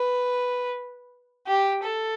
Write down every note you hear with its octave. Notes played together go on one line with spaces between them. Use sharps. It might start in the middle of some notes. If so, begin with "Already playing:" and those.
Already playing: B4
G4
A4